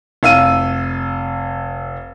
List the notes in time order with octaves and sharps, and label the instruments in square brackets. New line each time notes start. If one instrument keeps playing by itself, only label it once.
[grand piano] F1 F5 E6 D#7